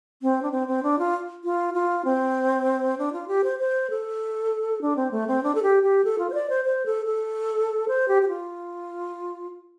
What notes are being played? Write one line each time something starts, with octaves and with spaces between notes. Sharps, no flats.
C4
D4
C4
C4
D4
F4
F4
F4
C4
D4
F4
G4
C5
C5
A4
D4
C4
A3
C4
D4
A4
G4
G4
A4
F4
C5
D5
C5
C5
A4
A4
C5
G4
G4
F4